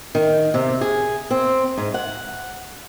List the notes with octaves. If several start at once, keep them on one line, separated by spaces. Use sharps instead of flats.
D#3
C3
G#4
C4
G#2
F#5